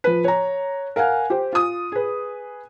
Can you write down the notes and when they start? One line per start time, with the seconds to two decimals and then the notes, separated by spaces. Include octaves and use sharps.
0.04 F3 B4
0.24 C#5 A#5
0.96 A#4 F5 F#5 G#5
1.30 G4 C5
1.53 F4 D#6
1.92 G#4 B4